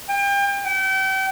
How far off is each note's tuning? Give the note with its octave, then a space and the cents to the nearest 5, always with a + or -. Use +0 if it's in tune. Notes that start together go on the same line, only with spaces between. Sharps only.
G5 +35
G5 -35